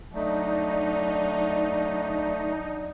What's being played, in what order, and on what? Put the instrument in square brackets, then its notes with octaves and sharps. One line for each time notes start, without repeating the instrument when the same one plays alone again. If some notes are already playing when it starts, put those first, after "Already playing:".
[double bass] F#3 D4 [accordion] A3 [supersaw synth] D#4 [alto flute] D5